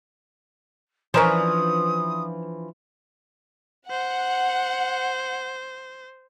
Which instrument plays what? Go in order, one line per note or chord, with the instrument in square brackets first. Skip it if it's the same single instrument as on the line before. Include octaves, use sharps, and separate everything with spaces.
[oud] E3 F3 D4 [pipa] C#4 A#4 C5 [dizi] D#6
[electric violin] C5 [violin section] F#5